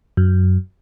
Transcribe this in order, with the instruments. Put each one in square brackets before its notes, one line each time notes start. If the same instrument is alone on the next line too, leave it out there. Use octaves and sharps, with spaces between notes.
[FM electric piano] F#2